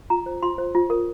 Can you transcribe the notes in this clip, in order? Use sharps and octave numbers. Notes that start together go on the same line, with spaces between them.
F4 A#5
C5
F4 C6
C5
F4
A#4